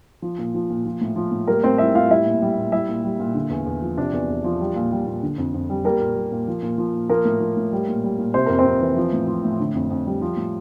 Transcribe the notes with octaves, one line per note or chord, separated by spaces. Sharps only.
F3
A#2
F3
A#2
F3
A2
F3
A2
G3 A#3 A#4
A2 C4 C5
G3 E4 E5
A2 F4 F5
G3 E4 E5
A#2
G3
A#2
G3 E4 E5
A#2
G3
A#2
D3
E2
E2
F3
C3 D4 D5
E2
E2
F3
G3
A#2
G3
A#2
D3
F2
F2
G3
G3 A#3 A#4
A#2
G3
A#2
F3
A#2
F3
A#2
F3 A#3 A#4
A2
F3
A2
G3
A#2
G3
A#2
C3 C5
F2 A#4
C4 C5
F2
E3
F3
A2
F3
A2
D3
F2
F2
G3
F3
A2